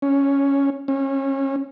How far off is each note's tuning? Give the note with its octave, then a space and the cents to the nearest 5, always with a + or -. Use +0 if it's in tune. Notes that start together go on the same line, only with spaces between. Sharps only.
C#4 +0
C#4 -30